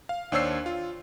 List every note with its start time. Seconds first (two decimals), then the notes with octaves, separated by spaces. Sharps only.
0.09 F5
0.32 D#2 D4 C5 C#5 E6 C7
0.66 F4